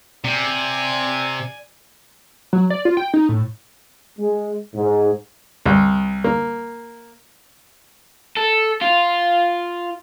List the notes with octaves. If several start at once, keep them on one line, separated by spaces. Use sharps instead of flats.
C3 D5 G#5
F#3
D5
F4
G5
D#4
A2
G#3
G#2
C2
A#3
A4
F4